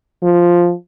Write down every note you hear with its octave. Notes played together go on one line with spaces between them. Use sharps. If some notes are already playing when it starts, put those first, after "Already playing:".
F3